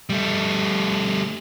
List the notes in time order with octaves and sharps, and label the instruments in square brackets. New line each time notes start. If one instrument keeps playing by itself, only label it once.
[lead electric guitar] G3 A3